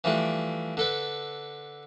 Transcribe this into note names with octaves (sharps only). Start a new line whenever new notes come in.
E3 F3 G3 A3 D4
D3 A4 B4